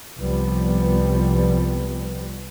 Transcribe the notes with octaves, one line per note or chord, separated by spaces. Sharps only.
C2 F3 G3 B3